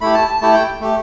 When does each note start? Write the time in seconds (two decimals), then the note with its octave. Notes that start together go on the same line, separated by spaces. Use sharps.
0.01 A3 E4 G4 B5
0.15 A5
0.27 A5
0.41 A3 E4 G4 A5
0.54 G5
0.81 A3 G4